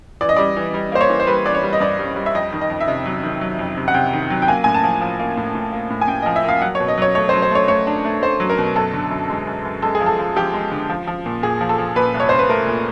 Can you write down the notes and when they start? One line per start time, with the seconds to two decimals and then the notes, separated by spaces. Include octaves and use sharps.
0.21 E3 D5
0.29 D#5
0.36 G3 D5
0.56 E3
0.74 G3
0.92 A#3 C5
1.01 C#5
1.09 E3
1.20 C5
1.27 G3 B4
1.45 E3 D5
1.55 C#5
1.63 G3
1.73 D#5
1.80 G2 D5
1.99 G3
2.16 G3
2.26 E5
2.35 F2 D#5
2.52 D#3
2.61 D#5
2.70 F2
2.81 E5
2.88 C3 D#5
3.06 F#3
3.23 D#3
3.41 F#3
3.59 F2
3.77 C3
3.88 F#5
3.94 C3 G5
4.13 D#3
4.30 F#3
4.42 G5
4.48 A#3 G#5
4.64 A2 G#5
4.74 A5
4.84 F3
5.01 F3
5.19 A#3
5.37 A2
5.55 A2
5.73 A#3
5.90 A2
6.01 G#5
6.08 A2 G5
6.22 F3 D#5
6.36 E5
6.44 A#3
6.49 F5
6.61 F#3 F#5
6.75 C#5
6.80 B2
6.88 D#5
6.98 F#3 C#5
7.15 A3 C#5
7.29 C5
7.33 F#3
7.42 C5
7.51 A3 C#5
7.68 A3 C#5
7.87 D4
8.05 A3
8.22 A3 C5
8.40 F#3
8.50 A#4
8.58 B2
8.76 F#2 A4
8.94 D3
9.11 F#2
9.30 G#3
9.47 F#2
9.65 F#2
9.82 G#3 A4
9.95 G#4
10.00 F3
10.06 A4
10.18 F3
10.36 F3 G4
10.54 G#3
10.72 D3
10.89 F3
11.07 F3
11.26 A#2
11.43 A#2 G#4
11.61 F3
11.69 A4
11.78 F3
11.96 A#2 B4
12.14 C2
12.20 C#5
12.29 C2 C5
12.39 B4
12.49 A3 A#4
12.67 A#2